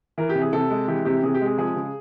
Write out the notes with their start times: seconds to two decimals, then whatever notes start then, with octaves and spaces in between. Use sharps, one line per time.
0.18 E3 A#4
0.29 G4
0.35 C3
0.41 G#4
0.53 C3 A4
0.70 G#3
0.88 E3 G4
1.05 C3 G4
1.23 C3 G#4
1.34 G4
1.41 G#3 G#4
1.58 F3 G#4
1.76 C#3